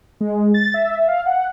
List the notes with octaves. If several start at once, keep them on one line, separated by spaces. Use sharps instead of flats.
G#3
A6
E5
F5
F#5